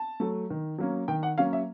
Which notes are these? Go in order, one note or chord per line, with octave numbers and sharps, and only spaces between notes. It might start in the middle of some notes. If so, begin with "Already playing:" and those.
Already playing: A5
F#3 A3
D#3
F#3 A#3 C#4
D#3 G5
F#5
F#3 A#3 C#4 F5
E5